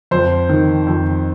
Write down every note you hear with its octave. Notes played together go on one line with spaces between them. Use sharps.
F2 C5
D#3
F2